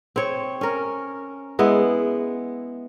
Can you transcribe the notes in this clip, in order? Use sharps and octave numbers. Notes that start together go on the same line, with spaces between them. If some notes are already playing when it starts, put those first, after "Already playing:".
C4 C#5
C#4 A#4
G#3 B3 E4